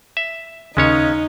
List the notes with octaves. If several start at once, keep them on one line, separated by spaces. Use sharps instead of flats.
E5
D#2 C#3 G#3 C#4 D#4 C#5